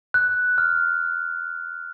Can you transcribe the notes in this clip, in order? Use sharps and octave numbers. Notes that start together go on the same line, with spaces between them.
F#6
F6